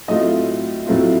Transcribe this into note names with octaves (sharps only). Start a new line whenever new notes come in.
A2 F#3 A3 C4 F4 D#5
A2 F#3 A3 C4 F4